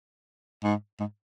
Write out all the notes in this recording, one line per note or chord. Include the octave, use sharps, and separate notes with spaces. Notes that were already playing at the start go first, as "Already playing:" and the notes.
G#2
G#2